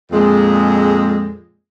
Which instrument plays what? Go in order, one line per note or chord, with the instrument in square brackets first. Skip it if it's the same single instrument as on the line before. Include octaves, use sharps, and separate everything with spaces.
[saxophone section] F2 A#2 G#3